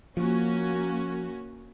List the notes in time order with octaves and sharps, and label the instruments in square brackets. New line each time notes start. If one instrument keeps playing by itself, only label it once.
[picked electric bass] F3 [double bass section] A#3 [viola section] C#4 F#4